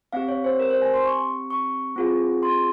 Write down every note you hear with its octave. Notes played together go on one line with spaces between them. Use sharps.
C4 G4 F5
C#5
C5
A#4
C5
G#5
C6
C#6
C#6
C4 F4 G#4
C6